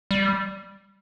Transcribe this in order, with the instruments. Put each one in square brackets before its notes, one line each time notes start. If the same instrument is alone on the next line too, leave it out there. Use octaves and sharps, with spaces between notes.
[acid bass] G3